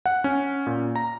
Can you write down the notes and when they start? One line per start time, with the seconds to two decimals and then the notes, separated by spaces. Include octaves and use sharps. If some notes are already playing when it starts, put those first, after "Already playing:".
0.06 F#5
0.24 C#4
0.67 A#2
0.96 A#5